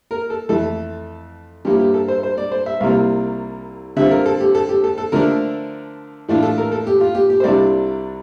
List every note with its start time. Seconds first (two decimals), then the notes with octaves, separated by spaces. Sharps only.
0.11 A#4
0.30 A4
0.49 F2 E3 A3 A4
1.65 G2 F3 A#3 E4 G4
1.79 G4
1.94 A4
2.08 C5
2.23 C5
2.38 D5
2.52 C5
2.66 E5
2.80 C2 C3 G3 A#3 F4 F5
3.97 D3 G3 C4 F4 E5
4.11 A#4
4.26 A4
4.41 G4
4.55 A4
4.69 G4
4.84 A4
4.98 A4
5.12 D3 F3 A3 D4 A#4
6.28 A2 E3 A3 D4 F4
6.42 A4
6.58 A#4
6.72 A4
6.87 G4
7.00 F4
7.15 G4
7.30 G4
7.40 C5
7.44 C2 C3 G3 D4 F4 D5